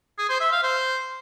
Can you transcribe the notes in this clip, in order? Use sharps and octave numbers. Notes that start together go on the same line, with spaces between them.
G#4
C5
E5
F5
C5